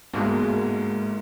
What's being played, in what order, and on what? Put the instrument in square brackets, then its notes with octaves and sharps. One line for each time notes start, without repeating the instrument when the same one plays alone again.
[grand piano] G1 G#2 [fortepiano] B2 G#3 [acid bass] A#3